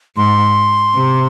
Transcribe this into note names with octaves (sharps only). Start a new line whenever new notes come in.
G#2 C6
C3